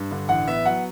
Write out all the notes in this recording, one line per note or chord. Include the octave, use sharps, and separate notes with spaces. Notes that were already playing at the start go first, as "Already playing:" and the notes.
Already playing: G2
D3
A1 F#5
B3 E5
F#3 F#5